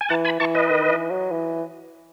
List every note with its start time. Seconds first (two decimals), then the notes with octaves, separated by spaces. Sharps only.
0.01 G#5
0.09 E3 F#5 A5
0.25 G#5 B5
0.40 E3 A5 C#6
0.55 B4 D#5
0.70 D#3
0.90 E3
1.11 F#3
1.31 E3